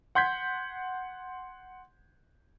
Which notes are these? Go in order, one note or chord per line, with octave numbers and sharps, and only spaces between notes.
F#5 C6 G6 G#6 B6